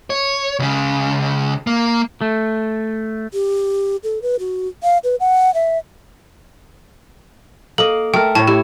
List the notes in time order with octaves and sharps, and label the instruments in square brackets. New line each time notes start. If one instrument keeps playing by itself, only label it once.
[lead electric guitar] C#5
C#2 C#3
A#3
[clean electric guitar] A3
[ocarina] G4
A4
B4
F#4
F5
B4
F#5
E5
[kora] A#3 D#5 [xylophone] A4
[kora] A3 A#4 [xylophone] G5
[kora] A2 C#5 [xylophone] A5
[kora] E4 [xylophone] G4